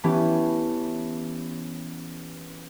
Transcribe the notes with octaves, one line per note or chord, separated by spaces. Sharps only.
E3 A3 B3 C#4 G4